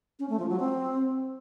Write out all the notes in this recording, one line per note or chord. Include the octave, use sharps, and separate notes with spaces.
C#4
A3
F3
F#3
C4